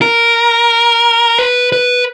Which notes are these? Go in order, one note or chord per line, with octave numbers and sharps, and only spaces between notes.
A#4
B4
B4